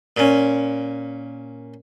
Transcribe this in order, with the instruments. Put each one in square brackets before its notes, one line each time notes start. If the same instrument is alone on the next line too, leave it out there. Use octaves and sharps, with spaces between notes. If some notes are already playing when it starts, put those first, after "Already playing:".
[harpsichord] A#2 C#4